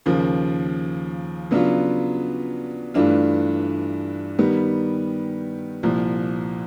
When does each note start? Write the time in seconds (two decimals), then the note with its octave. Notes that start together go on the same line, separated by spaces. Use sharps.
0.06 D#2 C#3 F3 A#3
1.51 C#3 F#3 B3 D4 F4
2.94 G2 E3 A3 D4 F4
4.39 D#3 G3 B3
5.83 C2 A#2 F3